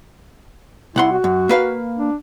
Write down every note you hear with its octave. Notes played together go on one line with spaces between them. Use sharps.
C2 E4 F#5 C6
F#4
F#2
A#3 B4 F5
D4